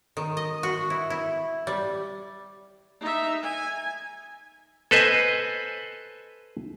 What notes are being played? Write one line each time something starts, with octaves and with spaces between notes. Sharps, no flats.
D#3
D#5
F#4
E4
E4
G3
D#4 E5
G#5
A4 B4 C5 D#5 G#5